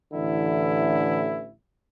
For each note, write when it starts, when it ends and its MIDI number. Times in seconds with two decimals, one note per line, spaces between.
0.14 1.51 33
0.14 1.51 50
0.14 1.51 52
0.14 1.51 64